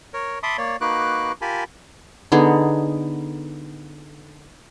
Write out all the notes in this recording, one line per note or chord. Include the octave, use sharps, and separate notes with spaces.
A#4 C#5
E5 A5 B5 C6 D6 D#6
A#3 C#5 D5
A#3 D#4 F#4 B4 D6 F#6
F4 G4 A#4 G#5 A5 B5
D3 B3 D#4 G#4